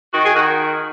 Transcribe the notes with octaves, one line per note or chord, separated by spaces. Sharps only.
D#3 F#4
G#4
D#3 F#4